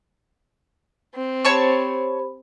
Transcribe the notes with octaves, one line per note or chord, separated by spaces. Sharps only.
C4
G4 C5 C#5 A5 B5 C#6